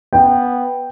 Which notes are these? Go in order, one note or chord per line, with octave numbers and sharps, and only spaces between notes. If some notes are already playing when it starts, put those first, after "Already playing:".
B3 G5